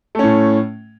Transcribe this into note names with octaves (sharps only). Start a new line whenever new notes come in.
A2 A3 C#4